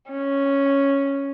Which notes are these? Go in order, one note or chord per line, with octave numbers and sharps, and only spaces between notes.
C#4